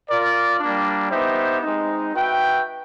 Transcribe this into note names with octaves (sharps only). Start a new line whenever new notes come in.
F4 A#4 D5
G3 A#3 D4
B3 D#4 G4 C5 E5
G#3 C4 D#4
F#4 B4 E5 G5